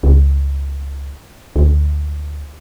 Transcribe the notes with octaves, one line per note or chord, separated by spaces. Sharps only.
C#2
D2